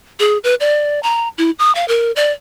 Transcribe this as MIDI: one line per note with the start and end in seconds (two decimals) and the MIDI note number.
0.20 0.38 68
0.44 0.55 71
0.60 1.02 74
1.03 1.28 82
1.38 1.50 64
1.59 1.74 87
1.75 1.87 77
1.88 2.11 70
2.16 2.32 74